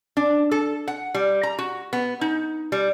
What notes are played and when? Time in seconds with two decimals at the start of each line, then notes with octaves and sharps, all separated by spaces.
0.17 D4
0.51 A4
0.88 F#5
1.14 G3
1.43 A#5
1.59 F#4
1.93 B3
2.21 D#4
2.72 G3